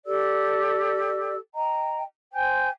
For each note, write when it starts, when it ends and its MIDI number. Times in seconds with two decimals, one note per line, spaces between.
0.05 1.37 67
0.05 1.37 69
0.05 1.37 74
0.05 1.37 88
1.54 2.02 75
1.54 2.02 79
1.54 2.02 82
2.32 2.69 72
2.32 2.69 79
2.32 2.69 80
2.32 2.69 91